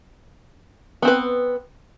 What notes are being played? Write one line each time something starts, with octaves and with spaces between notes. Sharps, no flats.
B3 C4 B4